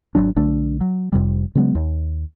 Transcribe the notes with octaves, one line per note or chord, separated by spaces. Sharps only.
G#1 E2 F#3 D4
B1 D3 A3 D4
F#3
F1 F2 C3 G3
C#3 F#3 G#3 B3
D#2